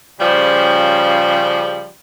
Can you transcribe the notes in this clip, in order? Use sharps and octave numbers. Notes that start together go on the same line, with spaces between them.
C#3 F3 G3